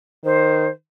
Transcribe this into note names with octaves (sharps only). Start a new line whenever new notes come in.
D#3 C5